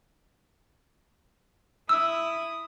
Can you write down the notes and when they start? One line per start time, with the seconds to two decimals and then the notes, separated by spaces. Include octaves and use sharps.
1.89 E4 D#6 E6